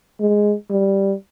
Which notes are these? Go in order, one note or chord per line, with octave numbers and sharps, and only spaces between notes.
G#3
G3